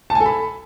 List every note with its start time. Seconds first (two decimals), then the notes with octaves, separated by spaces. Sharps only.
0.10 A5
0.15 G#5
0.20 A4
0.26 B5